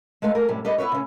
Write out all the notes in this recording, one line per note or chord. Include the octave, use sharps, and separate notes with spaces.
G#3 A3 B4 F5
G#4 A#4
F#2 A2 C3 G3
G3 D4 B4 D#5
B3 E4 G4 B4 C#5
C#3 C#4